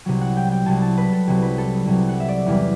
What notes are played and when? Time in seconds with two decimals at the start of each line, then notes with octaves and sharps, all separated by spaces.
0.06 C2 C3 F#3
0.21 F#5
0.37 G5
0.52 G5
0.66 C2 C3 F#3 A5
0.82 A5
0.97 B4
1.13 A4
1.27 C2 C3 F#3
1.42 B4
1.58 A4
1.86 C2 C3 F#3
2.09 F#5
2.20 E5
2.28 D5
2.46 E2 C3 G3 B4